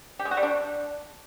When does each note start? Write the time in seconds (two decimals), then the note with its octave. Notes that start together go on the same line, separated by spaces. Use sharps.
0.19 G4
0.25 G#3
0.31 F#4
0.37 G3
0.43 D4